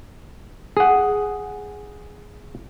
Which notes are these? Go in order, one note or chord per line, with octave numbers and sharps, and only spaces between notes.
G#4 F#5